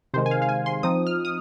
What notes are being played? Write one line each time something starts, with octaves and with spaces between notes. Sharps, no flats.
C3 D#3 G#3 C5
G#5
F5
F5
G#5
C6
F3 C4 D#4 D#6
F6
D#6